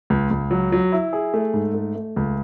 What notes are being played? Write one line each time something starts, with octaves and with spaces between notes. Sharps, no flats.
C#2
C#2
F#3
F#3
E4
G#4
A3
G#2
A3
A3
C#2